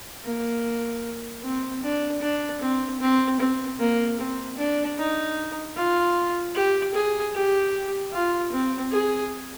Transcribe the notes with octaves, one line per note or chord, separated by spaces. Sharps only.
A#3
C4
D4
D4
C4
C4
C4
A#3
C4
D4
D#4
F4
G4
G#4
G4
F4
C4
G#4